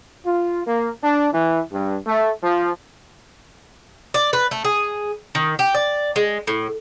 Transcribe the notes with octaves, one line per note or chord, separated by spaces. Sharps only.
F4
A#3
D4
E3
G2
A3
F3
D5
B4
A3
G#4
D#3
G4
D5
G#3
A2